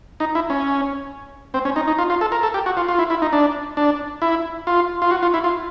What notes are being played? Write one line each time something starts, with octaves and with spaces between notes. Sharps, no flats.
D#4
E4
C#4
C4
C#4
D#4
D#4
F4
F4
A4
A#4
A4
G4
F#4
F4
F4
E4
E4
D#4
D4
D4
E4
F4
F4
F#4
F4
E4
F4